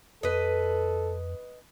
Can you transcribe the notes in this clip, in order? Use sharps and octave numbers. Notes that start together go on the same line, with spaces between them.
F2 A4 B4 D#5